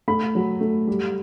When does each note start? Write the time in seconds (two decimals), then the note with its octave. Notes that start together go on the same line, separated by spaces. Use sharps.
0.08 A3 B5
0.35 F#3
0.61 A3
0.87 G3